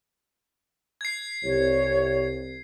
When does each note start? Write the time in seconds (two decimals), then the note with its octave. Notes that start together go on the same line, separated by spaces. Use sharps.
1.01 G#6 C7
1.44 C2 C#5